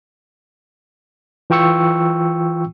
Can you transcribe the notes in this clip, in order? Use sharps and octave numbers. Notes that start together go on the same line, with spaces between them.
E3 F4 G5 C#6 E6 C#7